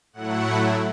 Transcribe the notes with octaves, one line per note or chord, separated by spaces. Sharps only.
A2 F#3 A3 E4 F#5